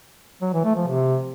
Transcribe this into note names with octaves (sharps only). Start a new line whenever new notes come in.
F#3
E3
A3
F3
C3